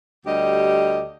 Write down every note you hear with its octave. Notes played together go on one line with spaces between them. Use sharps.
D2 G3 G4 D#5